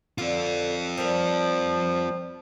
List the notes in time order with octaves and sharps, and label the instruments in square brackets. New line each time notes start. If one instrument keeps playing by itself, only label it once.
[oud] D3 [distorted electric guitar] C4 F4
[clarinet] F3 [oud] G3 A#4